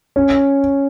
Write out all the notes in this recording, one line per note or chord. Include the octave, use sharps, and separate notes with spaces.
C#4